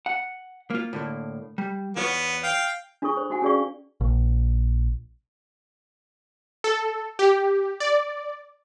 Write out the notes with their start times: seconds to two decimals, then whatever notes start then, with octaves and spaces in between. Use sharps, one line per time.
0.06 F#5
0.70 A#3 F4
0.93 A2 D3 A#3
1.58 G3
1.96 E2 B3 F4 C#5
2.43 F5 G5
3.02 D4 F4 G#4 A4 C#6
3.17 C5
3.30 D#4 F#4 F#5 G#5
3.42 C#4 F#4 G#4 D5 F5 C#6
4.01 A#1
6.64 A4
7.19 G4
7.80 D5